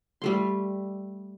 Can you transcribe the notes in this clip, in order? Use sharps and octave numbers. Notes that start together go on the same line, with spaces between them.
G3 A3 C6